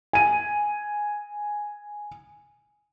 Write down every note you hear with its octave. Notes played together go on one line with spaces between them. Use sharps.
G#5 D#7